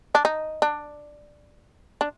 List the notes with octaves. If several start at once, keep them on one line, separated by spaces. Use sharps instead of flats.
D4
D#4
D4
D4